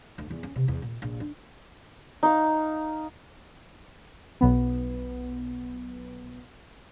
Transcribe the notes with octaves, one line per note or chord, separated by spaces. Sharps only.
D2
E2
C#4
C3
E2
A#2
A#1
D4
D#4 F5
B1 B3